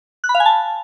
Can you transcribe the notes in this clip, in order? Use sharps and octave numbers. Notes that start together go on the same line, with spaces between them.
F#6
B5
F5
G#5
A5